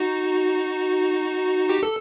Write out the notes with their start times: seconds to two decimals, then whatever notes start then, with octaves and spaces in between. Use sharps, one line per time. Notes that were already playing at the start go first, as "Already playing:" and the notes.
Already playing: D#4 F#4
1.69 G4
1.83 A4